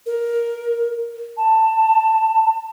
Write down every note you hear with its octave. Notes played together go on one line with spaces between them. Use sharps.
A#4
A5